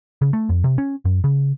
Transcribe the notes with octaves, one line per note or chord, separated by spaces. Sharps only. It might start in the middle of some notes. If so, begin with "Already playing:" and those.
C#3
A3
F2
C3
C#4
F#2
C#3